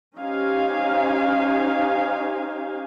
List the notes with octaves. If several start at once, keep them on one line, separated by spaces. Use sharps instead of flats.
C#4 D#4 G4 C5 F5 G#5